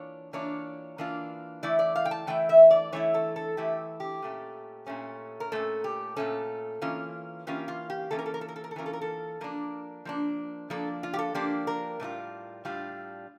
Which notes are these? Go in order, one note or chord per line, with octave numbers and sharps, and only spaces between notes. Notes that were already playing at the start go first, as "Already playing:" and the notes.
Already playing: E3 A#3 D4 F4 C#5
E3 A#3 D4 F4 C#5
E3 A#3 D4 F4
E3 A3 E4 D5
D5
F5
G5
A5
E3 A3 E4 G5
E5
D5
E3 A3 E4 C#5
A4
A4
E3 A3 E4 G4
G4
A#2 A3 C#4
A#2 A3 C#4
A#4
A#2 A3 C#4 A4
G4
A#2 A3 C#4 A4
E3 A#3 C#4 F4
E3 A#3 C#4 F4 G4
F4
G4
E3 A#3 C#4 F4 A4
A#4
A4
A#4
A4
A#4
A4
A#4
A4
E3 A#3 C#4 F4 A#4
A4
A#4
A4
F3 A#3 D4 A#4
F3 A#3 D4
F3 A#3 D4 A4
F4
G4
A4
F3 A#3 D4 G4
A#4
A2 G3 D4 F4
A2 G3 D4 F4